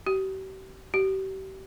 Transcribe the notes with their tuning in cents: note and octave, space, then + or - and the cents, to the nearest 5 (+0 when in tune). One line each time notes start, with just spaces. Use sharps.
G4 -40
G4 -35